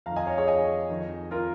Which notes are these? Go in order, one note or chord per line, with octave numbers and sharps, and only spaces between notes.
F2 D#3 F5 A#5
D#5 G#5
C#5 F5
G#4 C#5
D#5 G#5
F2 D#3
F4 A#4